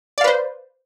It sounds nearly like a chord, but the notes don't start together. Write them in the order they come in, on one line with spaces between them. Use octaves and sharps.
D5 F5 B4 C5